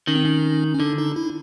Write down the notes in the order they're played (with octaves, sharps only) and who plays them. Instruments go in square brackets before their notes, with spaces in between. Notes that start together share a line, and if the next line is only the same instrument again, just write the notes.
[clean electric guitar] D#3 [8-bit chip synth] C#4
[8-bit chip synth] C4
C#4
C#4
[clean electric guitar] D3 [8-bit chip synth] D4
[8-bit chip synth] D#4
E4